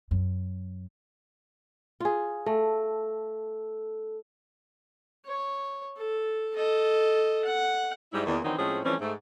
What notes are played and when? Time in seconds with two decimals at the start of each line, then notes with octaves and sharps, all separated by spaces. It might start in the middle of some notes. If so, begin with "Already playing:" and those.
0.11 F#2
2.00 F4 G#4
2.46 A3 A4
5.25 C#5
5.96 A4
6.55 A4 D#5
7.45 F#5
8.13 G#2 G3 E4
8.26 E2 A#2 D#3
8.44 D#3 E3 F#3 C4 D4 D#4
8.58 A2 F3 G#3 C4 C#4 G#4
8.85 E3 F3 G3 A3 C4 C#4
9.01 G#2 A3